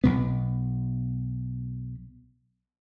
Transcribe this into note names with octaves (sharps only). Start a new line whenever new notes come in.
B1 B2 B3